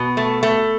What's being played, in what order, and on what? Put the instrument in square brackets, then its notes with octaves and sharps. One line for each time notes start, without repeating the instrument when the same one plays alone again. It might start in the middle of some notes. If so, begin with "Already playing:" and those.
Already playing: [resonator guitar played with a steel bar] B2
A3
A3